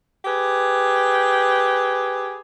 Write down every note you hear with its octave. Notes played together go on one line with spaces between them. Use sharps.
G4 G#4 B4